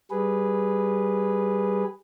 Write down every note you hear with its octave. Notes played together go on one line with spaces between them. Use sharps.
G3 G#4 B4